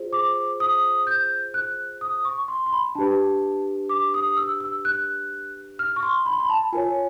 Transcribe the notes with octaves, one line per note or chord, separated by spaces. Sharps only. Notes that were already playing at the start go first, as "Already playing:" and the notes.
Already playing: F4 G#4 C5
D6
D#6
G6
F#6
D#6
C#6
C6
C6
B5
D4 G4 B4 A5
D6
D#6
E6
E6
F#6
F6
C#6
C6
B5
C6
B5
A5
F4 A#4 C#5 G#5